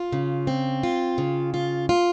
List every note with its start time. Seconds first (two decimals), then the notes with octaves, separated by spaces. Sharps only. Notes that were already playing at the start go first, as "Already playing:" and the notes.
Already playing: F4
0.12 C#3
0.47 C4
0.83 F4
1.18 C#3
1.54 F4
1.89 F4